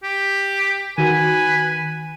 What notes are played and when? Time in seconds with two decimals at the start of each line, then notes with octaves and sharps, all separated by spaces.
0.03 G4
0.98 D#3 F#4 B4 G#5